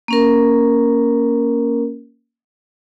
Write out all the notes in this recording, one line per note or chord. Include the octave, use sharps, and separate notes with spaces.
A#3 C#4 A#4